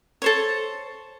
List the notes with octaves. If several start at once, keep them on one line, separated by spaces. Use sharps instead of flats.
A4 C5 C#5